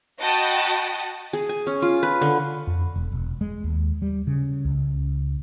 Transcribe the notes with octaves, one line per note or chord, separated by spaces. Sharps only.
F#4 D#5 G5 A5 B5 D#6
G#4
G#5
C#4
F4
B4
D3
F2
E1
E1
G#3
D#2
G3
C#3
C#2